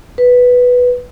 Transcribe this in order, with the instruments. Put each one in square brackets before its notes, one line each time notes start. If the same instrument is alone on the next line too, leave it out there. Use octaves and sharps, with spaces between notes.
[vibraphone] B4